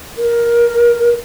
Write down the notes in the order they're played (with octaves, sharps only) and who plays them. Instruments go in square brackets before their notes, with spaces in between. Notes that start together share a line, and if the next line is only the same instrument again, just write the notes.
[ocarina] A#4